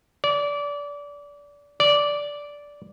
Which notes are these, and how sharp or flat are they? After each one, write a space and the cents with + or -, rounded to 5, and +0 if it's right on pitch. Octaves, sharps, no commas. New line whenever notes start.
D5 -25
D5 -10